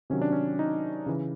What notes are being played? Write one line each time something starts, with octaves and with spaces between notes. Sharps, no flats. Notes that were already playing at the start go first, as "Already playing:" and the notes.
C3 D#3 F#3 C#4
D4
C#4
D#4
C#3 E3